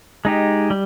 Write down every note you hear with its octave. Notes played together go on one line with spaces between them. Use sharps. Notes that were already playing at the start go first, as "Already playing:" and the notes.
G#3 D#4 G4
G3